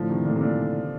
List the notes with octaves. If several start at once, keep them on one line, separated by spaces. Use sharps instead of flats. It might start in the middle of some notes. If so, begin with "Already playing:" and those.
Already playing: A2 D3 F3
C3 D#3
A#2 D3
C3
A#2 D3